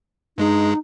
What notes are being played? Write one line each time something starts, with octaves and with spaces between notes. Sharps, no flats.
G2 G#3 D#4 G#4